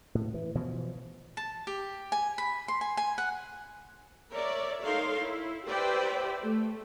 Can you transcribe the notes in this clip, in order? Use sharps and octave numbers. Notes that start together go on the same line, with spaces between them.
A2
E3
B2 E3 F3
A5
G4
G#5
B5
C6
G#5
G#5
F#5
A#4 C#5 D5 E5
D#4 A4 A#4 C#5 F5 C6
E4
G4 B4 C5 D5 E5 G5
A3